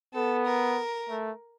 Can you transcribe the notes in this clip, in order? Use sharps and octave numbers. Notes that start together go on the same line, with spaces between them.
B3 A4
A#4
A3